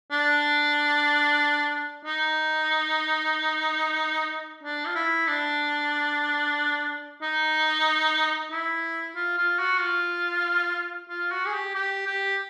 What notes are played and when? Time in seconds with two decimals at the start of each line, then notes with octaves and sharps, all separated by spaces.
0.12 D4
2.05 D#4
4.63 D4
4.87 F4
4.96 E4
5.28 D4
7.22 D#4
8.51 E4
9.15 F4
9.38 F4
9.59 F#4
9.81 F4
11.10 F4
11.32 F#4
11.46 G#4
11.53 G4
11.75 G4
12.07 G4